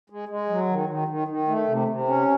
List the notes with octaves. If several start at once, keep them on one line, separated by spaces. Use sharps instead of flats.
G#3
G#3
F#3
D#3
D#3
D#3
D#3
A3
C3
C3
C#4